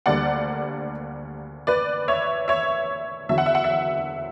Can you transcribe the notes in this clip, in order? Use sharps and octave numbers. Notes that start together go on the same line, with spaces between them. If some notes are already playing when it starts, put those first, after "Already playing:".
D2 D3 G3 A#3 D5 F#5
B4 D5
C#5 E5
C#5 E5
E2 D3 F#3 E5
F#5
E5
F#5
E5